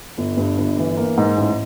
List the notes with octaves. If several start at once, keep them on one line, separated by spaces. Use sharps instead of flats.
G1
G2
G1
E3
A#3
G#2
A1